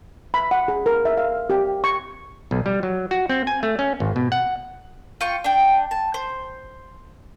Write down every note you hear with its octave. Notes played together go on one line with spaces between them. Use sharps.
B5
F#5
G#4
A#4
E5
F5
G4
C#6
B1
G3
F#3
F#4
C4
G#5
A3
C#4
G#1
B2
F#5
F4 G5 C#6
D4 G5
A5
C5